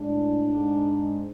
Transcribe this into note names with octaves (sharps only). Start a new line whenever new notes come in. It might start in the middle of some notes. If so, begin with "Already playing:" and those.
Already playing: A2 G#3 D4
G#2 G#3